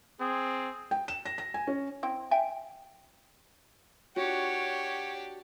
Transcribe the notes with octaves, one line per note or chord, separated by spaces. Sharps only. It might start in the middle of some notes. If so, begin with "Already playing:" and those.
C4 G#4
G5
E7
A#6
A#6
G#5
C#4
C4 E4 G5
E5 G5 G#5
D4 F#4 G4 C#5